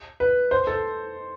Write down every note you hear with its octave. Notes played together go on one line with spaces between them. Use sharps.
B4
C5
A4